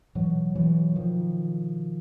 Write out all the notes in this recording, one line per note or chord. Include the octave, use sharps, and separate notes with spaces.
B2 E3 F#3
E3 F#3
D#3 F3